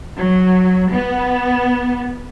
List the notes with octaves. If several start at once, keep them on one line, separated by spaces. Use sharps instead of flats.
F#3
B3